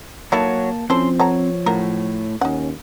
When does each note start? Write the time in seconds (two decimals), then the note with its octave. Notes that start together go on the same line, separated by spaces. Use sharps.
0.32 F#3 A#3 D#4 E4 A4 C#5 A5
0.90 F3 C4 C#4 E4 A4 C5 C6
1.20 B3 A4 C#5 A#5
1.66 A2 C#3 F#3 A#4
2.41 D#2 C#4 D#4 F#5